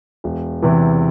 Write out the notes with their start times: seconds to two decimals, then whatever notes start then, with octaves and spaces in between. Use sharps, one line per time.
0.24 E1
0.62 E2 C3 E3